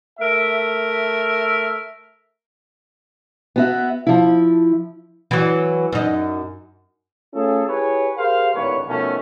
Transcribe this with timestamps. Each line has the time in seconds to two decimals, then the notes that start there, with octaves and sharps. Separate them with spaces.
0.19 A3 A#4 E5
3.56 B3 F#4 E5
4.07 F3 E4
5.31 E3 F#3
5.92 F#2 D#4
7.34 A3 C#4 F4 G#4 A4
7.67 E4 G4 G#4 B4 C#5
8.16 G4 G#4 A#4 C5 F5
8.54 G#1 D#2 A2 D3 B4 C#5
8.87 B2 D#3 F3 A3 B3 C#4